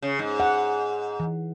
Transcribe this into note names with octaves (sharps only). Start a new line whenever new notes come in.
C#3
G#2
F#5
E3